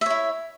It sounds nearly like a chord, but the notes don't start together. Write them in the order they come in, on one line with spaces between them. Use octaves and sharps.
E5 C#5 E4